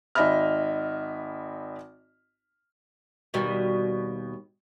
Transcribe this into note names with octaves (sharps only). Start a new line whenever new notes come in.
G#1 D#4 D#5 E5 B5 F6
D#2 B2 G3